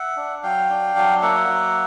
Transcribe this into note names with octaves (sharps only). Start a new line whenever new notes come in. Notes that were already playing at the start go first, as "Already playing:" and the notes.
Already playing: E5 F#5
D4
F#3 F5 G5
D4
F#3
A#3 E5 F#5
F#3